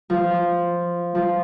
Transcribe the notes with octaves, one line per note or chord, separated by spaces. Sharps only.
F3
F3